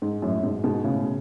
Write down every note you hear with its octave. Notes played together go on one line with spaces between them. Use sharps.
G#2
F#2 A2
G#2 B2
G#2 B2
A2 C#3